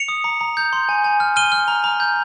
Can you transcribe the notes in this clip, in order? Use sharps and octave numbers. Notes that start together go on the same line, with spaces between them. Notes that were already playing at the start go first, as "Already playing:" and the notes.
Already playing: C#7 F7
D#6
A#5
A#5
G6
C6
G#5
G#5
F6
F6 D#7 G7
F6
A#5
A#5
G6